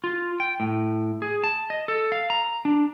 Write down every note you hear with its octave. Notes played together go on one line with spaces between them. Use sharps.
F4
G5
A2
G#4
A5
D#5
A4
F5
A#5
D4